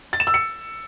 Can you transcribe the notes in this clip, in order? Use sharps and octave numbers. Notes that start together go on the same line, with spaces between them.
A6
E7
E6
C#7